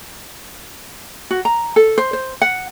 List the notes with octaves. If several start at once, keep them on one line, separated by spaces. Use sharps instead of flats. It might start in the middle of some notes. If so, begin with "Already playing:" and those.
F#4
A#5
A4
C5
C5
F#5